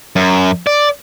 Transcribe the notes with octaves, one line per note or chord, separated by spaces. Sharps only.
F#2
D5